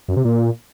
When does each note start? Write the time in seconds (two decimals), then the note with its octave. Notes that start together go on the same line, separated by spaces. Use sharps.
0.08 F#2
0.17 C3
0.25 A#2